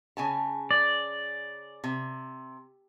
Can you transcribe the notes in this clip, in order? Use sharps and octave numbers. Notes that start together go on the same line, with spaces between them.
C#3 G#5 A5
D5
C3